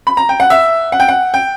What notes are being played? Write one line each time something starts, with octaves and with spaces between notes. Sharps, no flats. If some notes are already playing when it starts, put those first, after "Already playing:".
B5
A#5
G5
F#5
E5
F#5
G5
F#5
G5